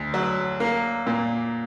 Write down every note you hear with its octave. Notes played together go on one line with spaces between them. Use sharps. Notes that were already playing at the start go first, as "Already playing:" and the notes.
Already playing: D2
F#3
A#3
A#2